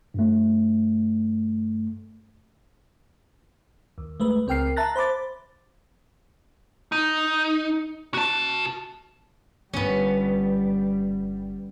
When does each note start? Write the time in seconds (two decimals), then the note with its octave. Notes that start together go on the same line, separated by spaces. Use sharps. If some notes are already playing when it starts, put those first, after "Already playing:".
0.14 G2 A3
3.98 D#2
4.20 G#3 A3 B4
4.47 C#2 C4 A#4 G5 F6 C7
4.76 E5 A5 A#5 F#6 A6 A#6
4.96 C5 B5 D6 A6
6.92 D#4
8.14 F#4 A5
9.73 G1 G3 B3 C#4